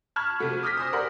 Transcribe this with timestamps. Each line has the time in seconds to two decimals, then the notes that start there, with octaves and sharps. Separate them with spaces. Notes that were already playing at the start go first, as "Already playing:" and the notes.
0.16 A5 B5 C#6 F6 G#6
0.39 C3 F3 A3 F#4
0.63 D6 D#6 F6 G6 A#6 B6
0.77 C5 G#5 D#6
0.93 G4 A#4 D5 F#5 B5 C6